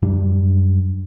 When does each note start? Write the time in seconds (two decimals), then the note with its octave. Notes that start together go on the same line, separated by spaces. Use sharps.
0.02 F#2 G3 D4